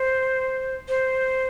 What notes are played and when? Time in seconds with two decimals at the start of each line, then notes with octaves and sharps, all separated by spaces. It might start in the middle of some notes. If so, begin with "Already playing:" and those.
Already playing: C5
0.88 C5